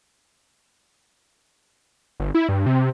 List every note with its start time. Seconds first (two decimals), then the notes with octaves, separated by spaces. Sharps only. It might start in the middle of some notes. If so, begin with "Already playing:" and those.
2.20 G1
2.35 E4
2.49 G2
2.66 C3